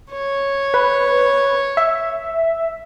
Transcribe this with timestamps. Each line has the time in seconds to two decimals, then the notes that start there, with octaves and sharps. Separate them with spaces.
0.10 C#5
0.74 B4
1.77 E5